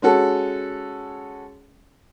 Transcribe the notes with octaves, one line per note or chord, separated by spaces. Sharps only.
G#3 C#4 F#4 A4